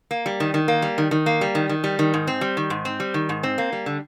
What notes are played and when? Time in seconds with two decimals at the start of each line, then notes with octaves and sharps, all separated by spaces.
0.11 A#3
0.26 G3
0.40 D#3
0.54 D#3
0.68 A#3
0.82 G3
0.98 D#3
1.11 D#3
1.26 A#3
1.41 G3
1.55 D#3
1.69 D#3
1.84 G3
1.99 D#3
2.14 G#2
2.27 C4
2.41 G3
2.57 D#3
2.70 G#2
2.85 C4
3.00 G3
3.14 D#3
3.29 G#2
3.43 C4
3.58 A#3
3.72 G3
3.86 D3